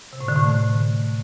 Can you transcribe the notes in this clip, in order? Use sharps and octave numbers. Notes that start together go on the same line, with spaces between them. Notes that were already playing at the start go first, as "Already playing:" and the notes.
C3
A2
D3
A2
A3